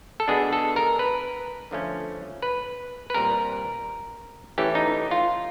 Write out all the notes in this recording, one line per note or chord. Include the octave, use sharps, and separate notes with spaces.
A4
B2 G#3 B3 D4 G#4
A4
A#4
B4
D3 F3 A3 C#4
B4
B4
A#2 G3 C4 A#4
E3 A3 C#4 G4
D#4
F4